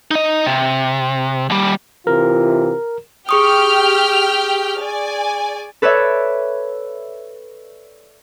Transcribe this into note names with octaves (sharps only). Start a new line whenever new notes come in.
D#4 D#5
C3
D#2 G3
C3 E3 F4 A#4
G4 G#4 G5 C#6 D#6 F6
D5 G#5
A4 B4 C#5 D5 E5